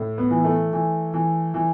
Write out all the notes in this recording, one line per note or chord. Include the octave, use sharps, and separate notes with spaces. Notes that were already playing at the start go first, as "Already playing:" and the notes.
Already playing: A2
B3
E3
A3
E3
E3
E3